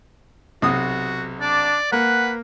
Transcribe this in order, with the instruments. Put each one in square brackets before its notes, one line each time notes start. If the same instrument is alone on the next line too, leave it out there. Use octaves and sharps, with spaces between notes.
[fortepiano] B1 C3 D#6 [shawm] F#4
[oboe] D4 [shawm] D5
[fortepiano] A#3 [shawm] B4 [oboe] F#5